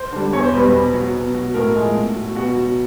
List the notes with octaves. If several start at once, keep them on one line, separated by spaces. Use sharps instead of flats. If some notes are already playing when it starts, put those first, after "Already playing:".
Already playing: C5
D3 G3
E2 C#5
C5
B2 G3 B4
B4
B2
F#3
B2
F#3
A2 A#4
F3 G#3
A2
F#3
B2 F#4
F#3